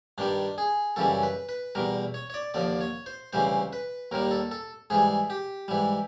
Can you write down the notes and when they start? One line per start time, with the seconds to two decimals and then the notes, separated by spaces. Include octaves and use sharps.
0.18 G2 D#3 G3 D4
0.58 G#4
0.96 F#2 C#3 E3 G3 A4
1.23 B4
1.49 B4
1.75 E2 B2 G3 A#4
2.14 C#5
2.30 C#5
2.34 D5
2.54 D#2 D3 F3 D5
2.81 C#5
3.06 C5
3.33 D2 C#3 E3 G3 C5
3.73 B4
4.11 D#2 D#3 G3 A#4
4.31 A4
4.51 A4
4.90 G#2 E3 G3 G#4
5.30 G4
5.68 G#2 E3 G3